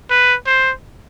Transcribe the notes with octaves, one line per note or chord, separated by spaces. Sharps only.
B4
C5